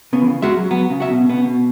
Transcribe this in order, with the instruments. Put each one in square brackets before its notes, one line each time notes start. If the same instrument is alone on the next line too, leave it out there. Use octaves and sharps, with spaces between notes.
[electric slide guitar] C#3 [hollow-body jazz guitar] B3
[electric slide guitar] E3
C#3
[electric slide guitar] G#3 [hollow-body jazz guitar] F#4 E5
[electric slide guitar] F#3
[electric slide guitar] F#3 [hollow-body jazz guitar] B3
[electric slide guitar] C#3
[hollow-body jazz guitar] F#4 E5
[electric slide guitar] B2
[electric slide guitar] B2 [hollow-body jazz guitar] B3
[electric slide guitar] C#3
B2